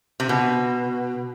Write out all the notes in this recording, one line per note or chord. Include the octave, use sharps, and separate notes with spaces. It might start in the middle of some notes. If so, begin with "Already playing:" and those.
C3
B2